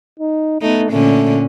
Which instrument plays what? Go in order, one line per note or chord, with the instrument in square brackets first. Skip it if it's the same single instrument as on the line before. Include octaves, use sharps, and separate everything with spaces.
[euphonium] D#4
[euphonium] A3 [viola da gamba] B3 D#4
[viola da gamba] A#2 D3 C#4 [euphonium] A3